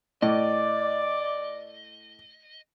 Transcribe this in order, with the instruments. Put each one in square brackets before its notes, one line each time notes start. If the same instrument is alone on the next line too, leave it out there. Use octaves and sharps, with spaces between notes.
[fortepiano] A2 [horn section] D5 [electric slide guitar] D#5